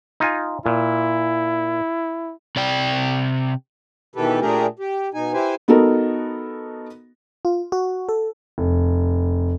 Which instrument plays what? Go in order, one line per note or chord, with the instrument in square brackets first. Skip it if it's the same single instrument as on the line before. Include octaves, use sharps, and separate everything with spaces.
[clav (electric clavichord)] D#4 F4 G#5
[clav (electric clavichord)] A#2 [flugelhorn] E4
[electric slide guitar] C3 D5 G5
[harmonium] B2 D#3 E3 G4 A4 B4
A#2 A3 D4 G4 G#4 A#4
G4
B2 D#4 G#5
E4 G4 B4 C5 G#5
[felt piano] B3 D#4 F#4 A4 A#4
[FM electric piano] F4
F#4
A4
[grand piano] F1